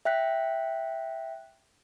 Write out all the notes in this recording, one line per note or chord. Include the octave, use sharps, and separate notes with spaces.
E5 G5 F#6 B6